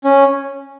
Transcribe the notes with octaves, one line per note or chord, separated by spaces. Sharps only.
C#4